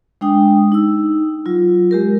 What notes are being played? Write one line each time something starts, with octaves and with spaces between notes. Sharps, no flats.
G#3 D4 G5 D#6
D#4 E6
F#3 F4
G#3 G4 A#4